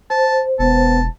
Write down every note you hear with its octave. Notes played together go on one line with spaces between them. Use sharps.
C5 A5
E1 B3 A5